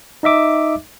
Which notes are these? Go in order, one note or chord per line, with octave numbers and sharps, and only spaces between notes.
D#4 D#5 E5 D6